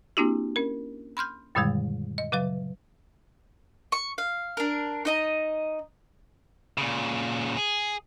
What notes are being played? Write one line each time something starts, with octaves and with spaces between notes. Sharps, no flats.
A#3 C4 D4 E4 F#4 G4
C#4 A#4
B5 C6 F6 G6
F#2 A#2 D3 D#3 G3 G#3
D#5
C#3 F#3 B4 F5
C#6
F5
D4 A#4
D#4 D#5 A#5
A#2 C#3
G#4